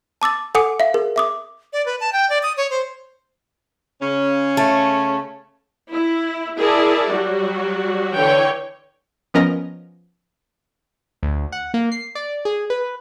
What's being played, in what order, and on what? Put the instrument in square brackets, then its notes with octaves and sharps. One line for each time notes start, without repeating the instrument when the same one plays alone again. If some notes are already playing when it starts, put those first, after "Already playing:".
[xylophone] A5 D6 E6 A6
A4 F#5 G#5 D6 D#6 C#7
E5 F5
G#4 A#4
E5 D6 D#6
[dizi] D5
B4
A5
G5
D5
D#6
C#5
C5
[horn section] C#3 C#4
[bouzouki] A3
[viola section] E4
E4 G#4 A#4 D5 A5
F#3 G3 F#4
D3 E3 C#5 G5
[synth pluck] F3 B3 C#4 A#4 D#5
[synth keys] D2
F#5
A#3
C7
D5
G#4
B4